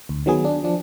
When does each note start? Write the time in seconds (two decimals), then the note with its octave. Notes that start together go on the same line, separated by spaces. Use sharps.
0.09 D2
0.26 D#3 F#3 B3 G#4
0.45 D4
0.64 F3 D4